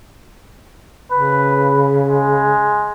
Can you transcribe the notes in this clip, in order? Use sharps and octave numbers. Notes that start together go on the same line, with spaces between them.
C#3 B4
G#3